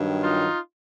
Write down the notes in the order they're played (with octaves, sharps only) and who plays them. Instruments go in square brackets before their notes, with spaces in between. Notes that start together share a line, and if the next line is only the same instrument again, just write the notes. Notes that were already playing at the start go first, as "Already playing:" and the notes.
Already playing: [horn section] G2 D#3 F#3
D#4 F4